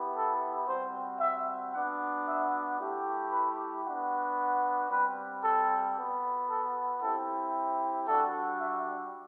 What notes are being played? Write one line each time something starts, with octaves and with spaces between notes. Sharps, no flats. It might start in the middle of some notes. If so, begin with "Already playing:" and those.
Already playing: B3 E4 G4
A4
G3 C4 F#4 C5
E5
B3 D4 F#4 F#5
E5
A3 E4 G4
B4
B3 D4 F#4
G3 C4 G4 B4
A4
B3 F#4
A4
C4 E4 G4 A4
G3 D4 F#4 A4
E5